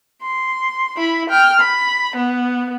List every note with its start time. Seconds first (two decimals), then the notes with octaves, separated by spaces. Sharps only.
0.22 C6
0.97 E4 B5
1.30 G5 F6
1.60 B5
2.16 B3